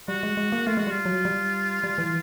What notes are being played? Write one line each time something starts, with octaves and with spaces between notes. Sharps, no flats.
G3 F#4
G#3
G#3
A#3
A3 F4
G#3 F#4
G3 F4
F#3
G3
G3
E3